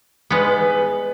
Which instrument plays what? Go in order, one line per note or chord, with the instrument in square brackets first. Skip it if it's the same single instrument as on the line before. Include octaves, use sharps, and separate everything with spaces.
[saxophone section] G#2 G3 B4 [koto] G#3 B3